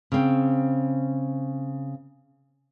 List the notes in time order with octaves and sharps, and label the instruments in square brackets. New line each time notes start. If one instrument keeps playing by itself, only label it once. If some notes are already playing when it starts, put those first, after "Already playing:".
[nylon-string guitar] C#3 C4